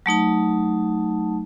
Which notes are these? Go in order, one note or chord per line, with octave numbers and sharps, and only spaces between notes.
F#3 A3 D#4 A5